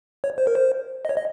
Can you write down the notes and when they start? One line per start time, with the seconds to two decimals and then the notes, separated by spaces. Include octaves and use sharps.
0.24 C#5
0.38 C5
0.47 A#4
0.55 C5
1.05 D#5
1.09 C#5
1.17 D#5